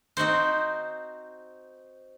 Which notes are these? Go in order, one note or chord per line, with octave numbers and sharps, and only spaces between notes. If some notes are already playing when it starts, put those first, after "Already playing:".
C4 D#4 F#4 C5